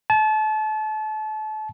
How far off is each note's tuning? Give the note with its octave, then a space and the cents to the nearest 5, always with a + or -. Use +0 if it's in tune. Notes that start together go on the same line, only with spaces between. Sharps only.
A5 -30